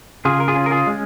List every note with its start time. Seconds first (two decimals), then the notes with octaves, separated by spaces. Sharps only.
0.25 C#3 F4 G#4
0.40 A#4
0.48 F4 G#4
0.56 C#4
0.66 A#4
0.71 F4 G#4
0.87 G#3